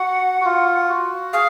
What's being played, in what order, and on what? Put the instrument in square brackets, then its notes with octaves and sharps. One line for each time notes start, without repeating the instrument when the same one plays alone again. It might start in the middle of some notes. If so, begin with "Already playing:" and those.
Already playing: [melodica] F#4 [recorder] F#5
[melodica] F#4
F4
F#4
[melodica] G#4 [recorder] F5